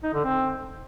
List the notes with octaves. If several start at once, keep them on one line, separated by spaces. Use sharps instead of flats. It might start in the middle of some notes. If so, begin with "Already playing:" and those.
D#4
D3
C4